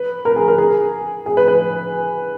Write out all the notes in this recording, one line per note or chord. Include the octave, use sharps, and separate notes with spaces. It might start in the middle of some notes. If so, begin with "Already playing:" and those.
Already playing: B4
A#4
G#4
A#4
G#4
G#4
B4
B4